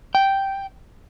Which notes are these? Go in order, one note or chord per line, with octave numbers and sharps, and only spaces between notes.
G5